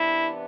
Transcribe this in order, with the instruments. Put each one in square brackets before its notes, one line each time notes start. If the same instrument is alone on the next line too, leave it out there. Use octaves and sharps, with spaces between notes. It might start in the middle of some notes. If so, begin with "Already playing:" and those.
Already playing: [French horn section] C3 E3 B3 D4 E4